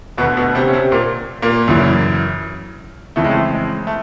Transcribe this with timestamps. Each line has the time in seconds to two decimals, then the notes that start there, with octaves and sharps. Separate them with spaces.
0.18 D2 B2 B3
0.22 D3
0.37 B2 B3
0.55 C3 C4
0.67 C#4
0.73 C3 C4
0.92 A#2 A#3
1.42 A#2 A#3
1.68 F#2 C#3 E3
3.16 F2 C#3 E3 A3
3.24 G#3
3.31 A3
3.54 G#3
3.87 A3